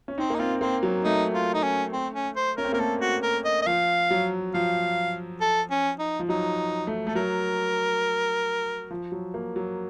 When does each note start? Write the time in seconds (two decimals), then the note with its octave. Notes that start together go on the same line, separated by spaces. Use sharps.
0.08 C#4
0.18 C4 D#4
0.30 A#3
0.35 D#4
0.39 C4 F4
0.61 A#3 C4
0.83 F#3
1.04 A3 D#4
1.34 F4
1.54 D#4
1.64 C#4
1.93 C4
2.14 C#4
2.36 C5
2.57 C#4 A#4
2.64 C4
2.72 A#3 A#4
2.79 A3 A4
3.01 F#4
3.23 A#4
3.45 D#5
3.62 D#5
3.67 F3 F5
4.11 F#3
4.54 F3 F5
5.41 A4
5.71 C#4
5.99 D#4
6.19 F3
6.29 F#3 D#4
6.87 A3
7.07 A3 A4
7.15 F#3 A#4
8.91 F3
9.12 F#3
9.34 A#3
9.56 F#3